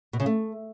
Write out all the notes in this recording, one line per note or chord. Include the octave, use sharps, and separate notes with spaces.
B2
C#3
A3